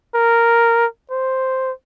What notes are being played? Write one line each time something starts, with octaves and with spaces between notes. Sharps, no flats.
A#4
C5